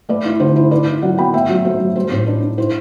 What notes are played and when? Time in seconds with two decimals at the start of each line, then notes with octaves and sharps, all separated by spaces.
0.09 A3 B4 D5
0.25 E4
0.40 D3 C5
0.56 E4 C5
0.71 E4 B4 D5
0.88 E4
1.02 F#3 D5 F#5
1.18 B3 G5 B5
1.33 A3 E5 G5
1.49 F#3
1.65 A3 C5 E5
1.80 F#3
1.96 G3 C5
2.11 A2 C5
2.26 D4 B4 D5
2.42 D4
2.58 E4 C5